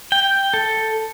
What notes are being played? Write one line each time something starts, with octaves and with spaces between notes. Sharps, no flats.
G5
A4